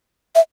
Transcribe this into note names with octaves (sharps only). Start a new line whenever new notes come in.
E5